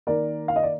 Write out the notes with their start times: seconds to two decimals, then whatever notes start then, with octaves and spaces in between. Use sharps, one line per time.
0.07 D#3 A#3 A#4 D5
0.48 F5
0.56 D#5
0.63 D5